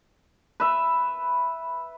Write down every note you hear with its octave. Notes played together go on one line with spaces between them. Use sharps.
B4 E5